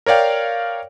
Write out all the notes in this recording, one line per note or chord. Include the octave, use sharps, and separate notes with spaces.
A#4 C#5 D5 F5 G5